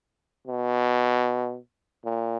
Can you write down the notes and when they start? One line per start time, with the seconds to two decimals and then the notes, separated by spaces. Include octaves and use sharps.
0.47 B2
2.05 A#2